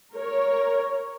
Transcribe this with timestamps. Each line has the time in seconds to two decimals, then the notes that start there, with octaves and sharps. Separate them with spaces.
0.12 A#4 C#5